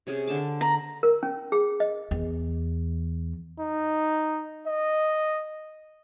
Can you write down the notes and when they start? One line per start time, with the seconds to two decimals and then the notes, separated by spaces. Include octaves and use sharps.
0.07 C3 C#4 G#4
0.27 D3 A5 D6
0.61 A#5 B5
1.03 A#4
1.23 C#4
1.52 G#4
1.80 D#5
2.11 E2
3.59 D#4
4.67 D#5